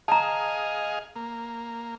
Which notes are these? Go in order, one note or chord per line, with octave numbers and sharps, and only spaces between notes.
G#4 D#5 F5 A5 A#5
A#3